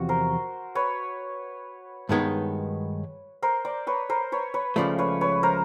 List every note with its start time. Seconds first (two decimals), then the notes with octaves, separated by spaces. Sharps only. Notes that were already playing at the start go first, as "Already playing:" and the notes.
Already playing: E2 C3 F3 F#4
0.09 A#4 C5
0.75 B4 C#5
2.09 G2 D#3 G#3 B3 D#4
3.42 A#4 C5
3.65 C5 D5
3.87 B4 C#5
4.09 A#4 C5
4.32 B4 C#5
4.54 B4 C#5
4.76 C#2 C#3 F3 A3 C5 D5
4.99 B4 C#5
5.21 B4 C#5
5.43 A#4 C5